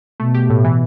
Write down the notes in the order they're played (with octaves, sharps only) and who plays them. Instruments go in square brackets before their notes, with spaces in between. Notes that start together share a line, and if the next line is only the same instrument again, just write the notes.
[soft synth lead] B2 [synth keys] A3
[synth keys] G4
A2
E3